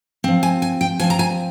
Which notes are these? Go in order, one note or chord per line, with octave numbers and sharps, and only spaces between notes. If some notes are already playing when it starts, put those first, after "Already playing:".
F3 C4
G#5
G#5
G5
F3 C4 G#5
A#5
G#5